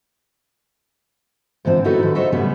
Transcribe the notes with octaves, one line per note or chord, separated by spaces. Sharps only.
G#2 D3 E3 C4 F4
B3 D#4 E4 F#4 A4 B4
D3 D#3 G3
F#4 A4 C5 C#5 D#5 E5
A2 C#3 G3 B3 C#4